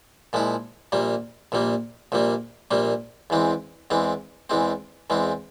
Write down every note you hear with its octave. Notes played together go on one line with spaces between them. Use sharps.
A#2 F3 G#3 E4
A#1 A#2 G3 A#3
A#1 A#2 G3 A#3
A#1 A#2 G3 A#3
A#1 A#2 G3 A#3
E2 E3 G#3 C4
E2 E3 G#3 C4
E2 E3 G#3 C4
E2 E3 G#3 C4